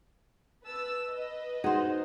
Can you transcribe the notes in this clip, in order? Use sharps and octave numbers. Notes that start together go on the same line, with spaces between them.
B4 A5 E6
B4 D#5
D#4 F#4 G#4 C5